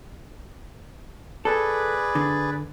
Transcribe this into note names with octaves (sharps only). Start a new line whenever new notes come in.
G#4 A4 B4 D5
D3